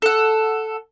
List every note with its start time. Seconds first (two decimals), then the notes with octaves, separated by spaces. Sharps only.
0.02 A4 F#5